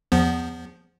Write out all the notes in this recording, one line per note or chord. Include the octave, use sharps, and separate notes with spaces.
E2 F3 B3